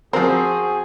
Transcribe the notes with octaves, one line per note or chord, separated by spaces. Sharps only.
F3 C4 F#4 G#4 A#4